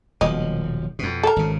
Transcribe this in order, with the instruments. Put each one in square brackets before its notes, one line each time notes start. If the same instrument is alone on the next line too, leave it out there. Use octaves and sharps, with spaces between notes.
[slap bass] D#1 B1 F3 [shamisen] D#5
[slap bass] F2 B2
[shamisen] A4 A#4
[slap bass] G#1 C#3